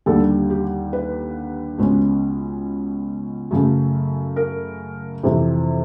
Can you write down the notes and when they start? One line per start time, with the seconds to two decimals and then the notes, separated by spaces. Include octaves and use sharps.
0.06 D#2 D3 G3 A4
0.50 G4
0.93 B4
1.78 C#2 B2 G#3 C#4
3.51 F#2 C#3 F#3 A3
4.36 A#4
5.23 F2 C3 E3